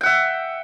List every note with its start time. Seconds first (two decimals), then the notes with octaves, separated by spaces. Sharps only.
0.01 G5
0.03 F#5
0.06 E5